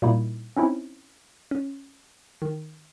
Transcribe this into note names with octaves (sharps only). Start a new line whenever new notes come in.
A#2 G3 A#3 D#4 E4
C4 C#4 D#4 E4
C#4
D#3